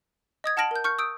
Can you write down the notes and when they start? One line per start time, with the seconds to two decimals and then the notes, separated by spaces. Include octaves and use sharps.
0.44 D#5 D#6 G#6 A6
0.57 F#5 A5 F6 A#6 D7 F#7
0.71 A#4 G6
0.84 C#6 F6 G6 C#7
0.99 D#6 E6 G6 D7